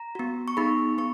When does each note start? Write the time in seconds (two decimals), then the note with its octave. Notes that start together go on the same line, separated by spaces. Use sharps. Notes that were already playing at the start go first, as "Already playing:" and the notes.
Already playing: A#5
0.15 B3 F#4
0.48 C#6
0.57 B3 D#4 G#4 B5
0.98 B3 C#6